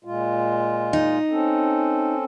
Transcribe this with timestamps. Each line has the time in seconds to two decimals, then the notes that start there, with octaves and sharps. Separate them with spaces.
0.05 A#2 G#3 F4
0.93 D#4
1.29 C4 C#4 A4